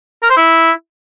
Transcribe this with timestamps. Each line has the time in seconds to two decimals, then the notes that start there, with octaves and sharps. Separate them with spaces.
0.23 A#4
0.30 C5
0.37 E4